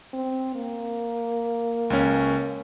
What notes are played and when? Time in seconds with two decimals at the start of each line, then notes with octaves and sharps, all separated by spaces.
0.14 C4
0.55 A#3
1.90 C#2 C#4